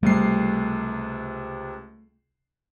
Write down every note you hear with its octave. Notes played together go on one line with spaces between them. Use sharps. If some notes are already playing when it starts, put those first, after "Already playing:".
C#2 C3 G3 A3 C7